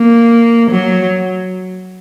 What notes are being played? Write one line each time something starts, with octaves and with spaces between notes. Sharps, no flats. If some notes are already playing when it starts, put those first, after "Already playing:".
Already playing: A#3
F#3